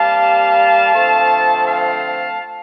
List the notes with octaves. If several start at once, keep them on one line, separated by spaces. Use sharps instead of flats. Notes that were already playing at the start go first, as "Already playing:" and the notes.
Already playing: C3 G3 A#3 F5 A5
D3 F3 A3 C4
F5 A5